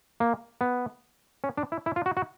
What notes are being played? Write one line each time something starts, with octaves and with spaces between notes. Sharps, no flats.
A#3
B3
C#4
D4
E4
E4
F4
F#4
F#4